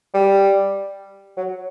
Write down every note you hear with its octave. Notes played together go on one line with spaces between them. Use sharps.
G3
F#3